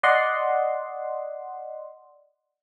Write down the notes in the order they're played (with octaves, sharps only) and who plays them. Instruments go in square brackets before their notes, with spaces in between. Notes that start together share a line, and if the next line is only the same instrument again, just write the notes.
[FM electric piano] D5 D#5 F#5 C6